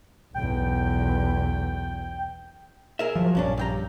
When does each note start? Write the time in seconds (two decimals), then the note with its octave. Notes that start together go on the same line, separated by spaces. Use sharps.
0.34 B1 E2 G5
2.99 G#4 A#4 E5
3.16 F3 F#3
3.35 A#1 G2 C#4 D4
3.57 G2 G5 A#5